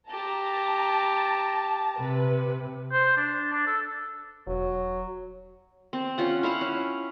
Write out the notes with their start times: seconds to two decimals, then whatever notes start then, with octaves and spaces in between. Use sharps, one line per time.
0.10 G4 A5 A#5
2.00 C3 B4
2.92 C5
3.17 D4
3.52 D4
3.67 A4
4.47 E1 F#3
5.93 C4
6.18 C#4 F4 F#5
6.43 E4 C5 F5 F#5
6.61 C#4